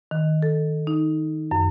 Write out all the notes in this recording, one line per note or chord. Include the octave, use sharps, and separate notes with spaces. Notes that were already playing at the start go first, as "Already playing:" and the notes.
D#3
A4
D#4
F#2